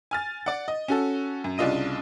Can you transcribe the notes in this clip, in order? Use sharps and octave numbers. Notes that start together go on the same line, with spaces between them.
G#5 F6 A6
D5 F#5
D#5
C#4 F#4 A4
F#2
C2 C#3 D4 F4 D#5 D#7